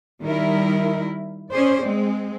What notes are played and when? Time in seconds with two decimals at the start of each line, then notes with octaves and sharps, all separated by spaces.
0.22 D#3 G3 E4 A#4
1.51 C#4 G#4 C5 D5
1.82 G#3 C4